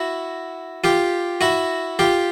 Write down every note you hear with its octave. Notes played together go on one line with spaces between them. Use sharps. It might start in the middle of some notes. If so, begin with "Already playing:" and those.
Already playing: E4 F#4
F4 G4
E4 F#4
F4 G4